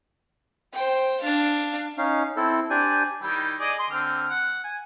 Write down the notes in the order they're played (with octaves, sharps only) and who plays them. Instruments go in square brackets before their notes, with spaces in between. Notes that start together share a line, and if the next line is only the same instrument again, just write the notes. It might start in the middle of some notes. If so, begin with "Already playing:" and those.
[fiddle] C5 G5
D4 F5
[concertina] C#4 D#4 F5
C4 E4 A4
D4 G4 C5 D5 G#5
[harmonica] D#3 G3 E4
G#4 D5 D#5
C6
D3 C4 F6
F#5
G#5